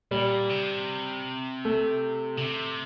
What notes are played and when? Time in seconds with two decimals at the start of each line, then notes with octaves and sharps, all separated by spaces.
0.11 A#2 G3
0.50 C3
1.65 A3
2.37 D3
2.42 C3